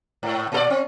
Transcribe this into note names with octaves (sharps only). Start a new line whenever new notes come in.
G#2
A#2 A4 D5
C4